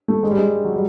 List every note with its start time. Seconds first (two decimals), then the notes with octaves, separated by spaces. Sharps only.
0.08 A3
0.23 G#3
0.31 G3
0.38 G#3
0.65 F#3
0.74 G3